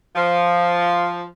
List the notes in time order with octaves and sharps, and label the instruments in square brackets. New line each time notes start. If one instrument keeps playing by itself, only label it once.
[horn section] F3